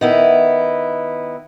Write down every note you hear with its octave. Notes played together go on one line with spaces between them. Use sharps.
D#3 B3 E4